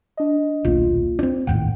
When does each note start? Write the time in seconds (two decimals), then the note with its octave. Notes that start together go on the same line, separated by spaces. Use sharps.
0.17 D4 D#5
0.65 D#1 B1 A#3 F4
1.19 C4 D4
1.47 G#1 D#2 A2 F#5 G5